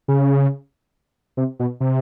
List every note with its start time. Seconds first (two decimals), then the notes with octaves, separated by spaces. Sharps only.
0.08 C#3
1.37 C3
1.60 B2
1.80 C3